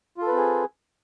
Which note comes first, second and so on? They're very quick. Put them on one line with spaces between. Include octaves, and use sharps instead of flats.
F4 A4 B4 C4 G#4